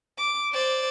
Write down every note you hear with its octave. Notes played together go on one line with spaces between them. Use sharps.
D6
C5 D5